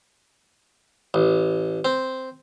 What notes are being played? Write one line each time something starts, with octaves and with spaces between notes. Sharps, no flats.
A1
C4